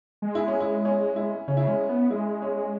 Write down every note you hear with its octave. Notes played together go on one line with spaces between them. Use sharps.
G#3
E4
C#4
E4
C#4
E4
C#3 C#4
E4
G#3 C#4
B3
G#3 E4
C#4